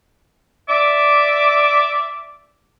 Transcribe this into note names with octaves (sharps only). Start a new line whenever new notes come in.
D5 E5 D6